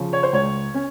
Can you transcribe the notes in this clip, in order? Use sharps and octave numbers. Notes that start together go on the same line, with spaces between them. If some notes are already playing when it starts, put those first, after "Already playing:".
Already playing: C#3 F3 C#4
C#5
C5
C#2 C#5
C#4